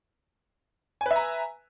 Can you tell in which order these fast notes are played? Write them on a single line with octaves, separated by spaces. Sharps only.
G#5 B4 E5 A#5